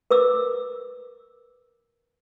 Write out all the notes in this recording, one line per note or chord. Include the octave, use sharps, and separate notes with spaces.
A#4 B4 D6 E6